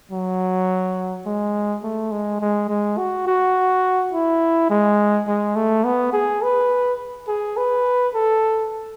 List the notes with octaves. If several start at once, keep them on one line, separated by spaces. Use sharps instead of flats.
F#3
G#3
A3
G#3
G#3
G#3
F#4
F#4
E4
G#3
G#3
A3
B3
G#4
B4
G#4
B4
A4